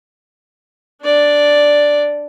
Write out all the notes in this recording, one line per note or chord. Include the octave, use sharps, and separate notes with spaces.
D4 D5